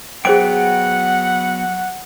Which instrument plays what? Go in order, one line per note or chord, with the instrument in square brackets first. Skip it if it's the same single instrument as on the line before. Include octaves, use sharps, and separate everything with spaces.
[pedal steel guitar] F#3 B3 G5 [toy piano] G#4 C5 D6 [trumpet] F#5